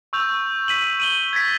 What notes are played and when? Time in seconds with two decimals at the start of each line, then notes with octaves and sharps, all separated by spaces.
0.13 C#6 E6 G6 F7
0.68 B6 D#7 F#7
1.00 D#7 F#7 G7
1.33 G#6 A6 B6